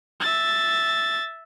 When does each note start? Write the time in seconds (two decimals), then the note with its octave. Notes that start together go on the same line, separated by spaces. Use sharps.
0.21 E5 A6